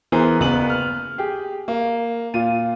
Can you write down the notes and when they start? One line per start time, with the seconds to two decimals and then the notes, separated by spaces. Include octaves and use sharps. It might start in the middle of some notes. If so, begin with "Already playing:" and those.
0.12 E3 B3 G#4 A#4 C5
0.40 F#1 B3 F#7
0.70 F6
1.18 G4 G#4
1.68 A#3
2.34 A#2 F4 D#7